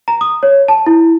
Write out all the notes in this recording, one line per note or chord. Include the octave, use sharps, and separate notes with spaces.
A#5
D#6
C#5
A5
E4